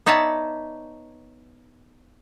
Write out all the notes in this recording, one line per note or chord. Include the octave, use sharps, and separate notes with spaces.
B3 D#4 C#5 D5 E5 A5